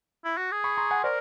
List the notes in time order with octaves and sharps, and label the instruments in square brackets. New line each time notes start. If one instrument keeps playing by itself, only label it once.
[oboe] E4
F#4
G#4
[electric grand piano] B5 C#6
A#5 C6
F#5 G#5
[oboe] A#4 [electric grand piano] C5 D5